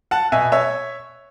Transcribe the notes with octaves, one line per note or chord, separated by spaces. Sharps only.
F#5 A5
B2 E5 G#5
C#5 E5